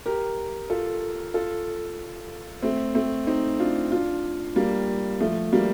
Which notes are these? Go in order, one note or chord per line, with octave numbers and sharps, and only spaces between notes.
G4 A#4
F4 A4
F4 A4
A3 C4
A3 C4
C4 D#4
D4 F4
D4 F4
G3 A#3
F3 A3
G3 A#3